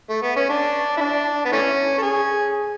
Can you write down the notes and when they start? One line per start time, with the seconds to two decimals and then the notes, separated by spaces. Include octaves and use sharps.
0.09 A3
0.23 B3
0.36 C#4
0.50 D4
0.97 E4
1.01 D4
1.45 B3
1.52 E3 A3 C#4
1.98 A4
2.02 G#4